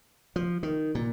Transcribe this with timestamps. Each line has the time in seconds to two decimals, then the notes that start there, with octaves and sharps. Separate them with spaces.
0.36 F3
0.63 D#3
0.95 A#2